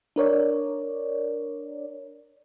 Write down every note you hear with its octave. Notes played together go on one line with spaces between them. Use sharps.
D4 A#4 C#5 D5